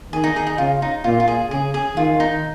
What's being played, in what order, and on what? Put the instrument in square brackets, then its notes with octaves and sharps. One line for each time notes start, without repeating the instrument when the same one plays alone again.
[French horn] D#3 [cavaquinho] G#4
[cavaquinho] D#4
G#4
D#4
[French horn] C#3 [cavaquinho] F4
[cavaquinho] D#4
[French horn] A#2 [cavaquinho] F4
[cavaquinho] F4
G#4
[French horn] C#3 [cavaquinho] G#4
[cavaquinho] G#4
[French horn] D#3 [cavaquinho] F4
[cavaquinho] D#4